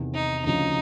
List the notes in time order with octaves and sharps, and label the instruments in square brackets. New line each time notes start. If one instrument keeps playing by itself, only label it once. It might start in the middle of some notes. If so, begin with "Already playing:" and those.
Already playing: [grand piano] E2 C3 D#3
[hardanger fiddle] D#4
[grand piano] D2 C#3 F3 [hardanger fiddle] D#4